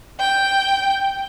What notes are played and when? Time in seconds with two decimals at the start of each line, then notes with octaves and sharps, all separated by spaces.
0.20 G5